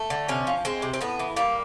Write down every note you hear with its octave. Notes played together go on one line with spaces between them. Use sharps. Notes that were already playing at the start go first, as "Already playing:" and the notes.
Already playing: A3
D3
C3 C#4
F3
G#3 C4
C3
C4
A2 B3
E3
G3 A#3